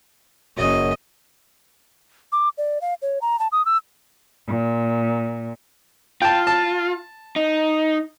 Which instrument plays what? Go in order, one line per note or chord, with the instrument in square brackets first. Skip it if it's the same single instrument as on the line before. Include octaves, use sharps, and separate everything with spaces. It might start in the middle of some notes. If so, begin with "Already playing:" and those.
[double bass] F#1 C#4 [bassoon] F#2 [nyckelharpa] D#5
[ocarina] D6
D5
F5
C#5
A#5
A5
D#6
E6
[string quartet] A#2
[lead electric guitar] F4 [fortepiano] G5 A5
[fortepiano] A5
[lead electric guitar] D#4